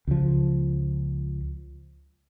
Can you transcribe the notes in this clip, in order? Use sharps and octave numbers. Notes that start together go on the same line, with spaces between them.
C#2 F3